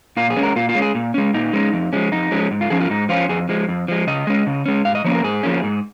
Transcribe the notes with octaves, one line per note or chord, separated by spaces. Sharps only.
A#2 F4
G#4
G#3 C#4
A#4
A#2 F4
F4
G#3 C#4
G#4
A#2
G#3 C#4
A#2 D#4
G#3 C#4
F2
F3 G#3 C#4
F2 D#4
F3 G#3 C#4
G#2
F4
F3 C#4 G#4
F4
G#2 D#4
F3 C#4 F4
F2 G#4
F3 G#3
F2
F3 G#3
C#3 D#5
G#3 C#4
C#3
G#3 C#4
G#2 F5
D#5
F3 A#3 C#4 C#5
A#4
G#2 G#4
F3 A#3 C#4
G#2